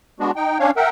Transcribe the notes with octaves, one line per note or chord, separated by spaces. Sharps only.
G#3 B3 D4 F#4
D#4 G5
C#4 D4 C#5 F5
A#4 E5 F#5 G5